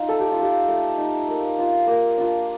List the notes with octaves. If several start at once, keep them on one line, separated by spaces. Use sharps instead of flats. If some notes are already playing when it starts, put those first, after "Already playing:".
Already playing: D#4 F4
A3 A4
G4
F4
D#4 G4
A3
D#4
A#3
D4 F4
A#3
D4 F4